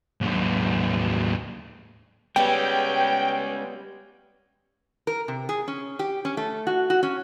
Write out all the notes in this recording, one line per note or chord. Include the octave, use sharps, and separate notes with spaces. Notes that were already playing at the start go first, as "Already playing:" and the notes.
D#2 F#3
G3 G#3 B3 C#4 G5
A#4
C3
G#4
C#4
G4
C#4
A3
F#4
F#4
C#4